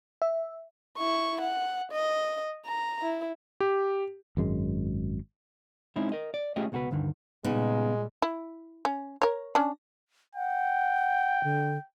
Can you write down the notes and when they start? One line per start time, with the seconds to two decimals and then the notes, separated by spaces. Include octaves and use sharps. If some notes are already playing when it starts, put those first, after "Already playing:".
0.22 E5
0.98 E4 C#6
1.41 F#5
1.92 D#5
2.66 A#5
3.02 E4
3.60 G4
4.37 G#1 F#2 G#3
5.96 G#3 C4 C#4 D#4 E4
6.12 A#4 D#5
6.34 D5
6.56 A3 C#4 F4 G4 G#4 D#5
6.72 C#2 B2 F#4 A4 B4
6.91 D2 G2 D3 D#3
7.44 A#2 C#3 G3 G#3 B3 D#4
8.22 E4
8.85 C#4
9.22 A#4 C#5
9.55 C#4 D4
10.35 F#5 G5
11.44 D3